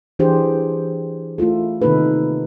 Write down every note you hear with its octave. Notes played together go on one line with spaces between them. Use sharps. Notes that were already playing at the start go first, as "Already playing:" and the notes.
E3 D4 G4 G#4 C5
A3 E4 F4 A4
C3 D#3 A#3 D#4 A4 B4